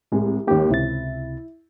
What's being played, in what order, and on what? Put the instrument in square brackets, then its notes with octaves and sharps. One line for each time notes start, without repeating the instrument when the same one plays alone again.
[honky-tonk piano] C2 G#3 [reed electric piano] A2
[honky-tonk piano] D#2 G#2 [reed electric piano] A#3 G4
[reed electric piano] C#2 C3 A6 [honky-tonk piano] E4